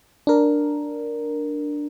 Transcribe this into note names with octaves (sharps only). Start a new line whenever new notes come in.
D4 A#4